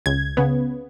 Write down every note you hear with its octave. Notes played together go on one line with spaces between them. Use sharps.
C#2 G#6
C#3 B3